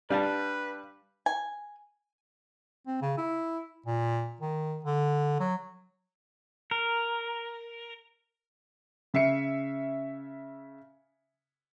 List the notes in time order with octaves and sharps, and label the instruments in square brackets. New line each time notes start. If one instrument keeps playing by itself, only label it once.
[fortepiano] G3 [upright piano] D4 [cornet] B4 [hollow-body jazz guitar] D5 F5 A5
[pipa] G#5
[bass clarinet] C4
C#3
E4
A#2
D#3
D3
F#3
[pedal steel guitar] A#4
[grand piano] C#3 E5 C7 C#7